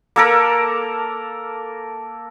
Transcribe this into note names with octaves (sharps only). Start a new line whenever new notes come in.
A#3 A4 A#4